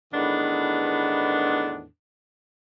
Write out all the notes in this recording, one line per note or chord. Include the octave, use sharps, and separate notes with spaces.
E2 A2 D#3 B3 D4